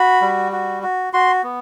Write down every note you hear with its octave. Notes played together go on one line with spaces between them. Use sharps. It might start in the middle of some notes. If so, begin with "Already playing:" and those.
Already playing: F#4 B5
G3
F#4
F#4
F#4 C6
B3